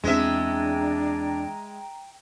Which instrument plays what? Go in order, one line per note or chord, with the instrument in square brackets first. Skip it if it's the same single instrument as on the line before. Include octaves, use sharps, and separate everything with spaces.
[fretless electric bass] E2 C4 [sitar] G#3 E5 [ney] D4 [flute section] G5 A#5